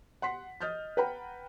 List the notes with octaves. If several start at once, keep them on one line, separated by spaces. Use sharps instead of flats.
F#5 C6 B6
D#5 D#6 F6 G6 A6
B4 F#5 G5 A#5 B5